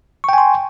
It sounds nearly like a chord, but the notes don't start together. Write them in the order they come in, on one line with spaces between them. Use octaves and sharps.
C#6 G5 G#5 C6